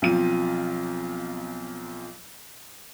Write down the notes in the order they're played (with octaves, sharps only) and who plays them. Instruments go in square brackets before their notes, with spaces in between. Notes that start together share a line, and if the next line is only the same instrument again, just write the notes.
[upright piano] B1 F3 C4 F4 D#7